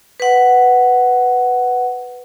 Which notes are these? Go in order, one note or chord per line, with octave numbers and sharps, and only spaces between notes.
B4 F#5